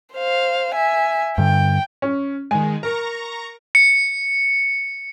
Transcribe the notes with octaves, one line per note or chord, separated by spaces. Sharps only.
C5 F5
E5 G#5
G2 D3 G5
C#4
D#3 G#3 G#5
A#4 A#5 C#6 A#6
C#7